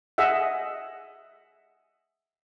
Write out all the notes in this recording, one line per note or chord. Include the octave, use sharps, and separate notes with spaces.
G#4 D#5 E5 F#5